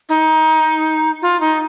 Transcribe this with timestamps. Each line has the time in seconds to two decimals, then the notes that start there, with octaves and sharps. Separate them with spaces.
0.09 D#4
1.22 F4
1.41 D#4